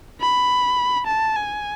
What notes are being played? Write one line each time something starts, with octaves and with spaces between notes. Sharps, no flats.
B5
A5
G#5